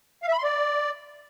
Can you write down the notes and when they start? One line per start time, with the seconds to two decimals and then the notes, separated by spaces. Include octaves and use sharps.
0.23 F5
0.28 E5
0.33 B5
0.38 C6
0.43 D5